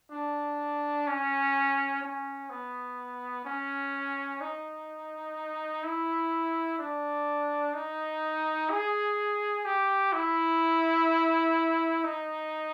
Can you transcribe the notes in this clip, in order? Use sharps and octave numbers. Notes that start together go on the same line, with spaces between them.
D4
C#4
C#4
B3
C#4
D#4
E4
D4
D#4
G#4
G4
E4
D#4